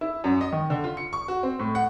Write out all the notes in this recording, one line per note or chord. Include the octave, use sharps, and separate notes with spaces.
E4
F#2
D#5
D#3
D3
F4
C#7
C#6
F#4
C4
A2
F#5